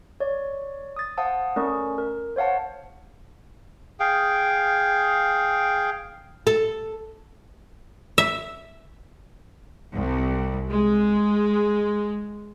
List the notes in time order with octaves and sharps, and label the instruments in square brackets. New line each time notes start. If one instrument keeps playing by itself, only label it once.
[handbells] C#5 D5
D#6 A6
C5 F5 F#5 A5 D#6
A3 C#4 A#4 D5 C#6
A#4
C5 C#5 F5 F#5 A5
[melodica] G#4 F5 G5
[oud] A4
[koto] E5
[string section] C2
G#3